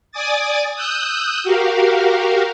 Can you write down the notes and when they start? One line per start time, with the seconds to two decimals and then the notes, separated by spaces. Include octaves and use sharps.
0.12 D5 G#5 D6 D#6 A6
0.75 D#6 E6 F#6 G6
1.44 F#4 G4 A#4 F5